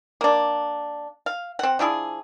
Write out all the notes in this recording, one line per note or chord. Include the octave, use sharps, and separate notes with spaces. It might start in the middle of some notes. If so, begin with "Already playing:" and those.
A#3 D4
F5
C4 F#5
F3 D4 E4 G#4